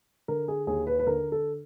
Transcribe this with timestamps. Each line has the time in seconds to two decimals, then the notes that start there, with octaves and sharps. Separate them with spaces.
0.28 D3 A#4
0.48 G#4
0.67 D#2 G#4
0.87 B4
0.99 B4
1.07 D3 A#4
1.32 A4